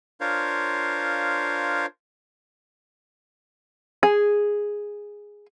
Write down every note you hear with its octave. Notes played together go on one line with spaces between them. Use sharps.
D4 F4 A#4 C5 C#5 F5
G#4